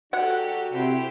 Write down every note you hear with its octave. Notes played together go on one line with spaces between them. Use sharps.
F#3 D4 F#4 G4 A4 F#5
C3 E4 G4 C5